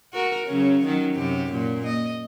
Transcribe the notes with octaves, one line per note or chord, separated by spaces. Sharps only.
F#4 A#4
C#3 F#3 C#4
D#3 F#3 C#4
F#2 C3 G4
A#2 A#3
D#5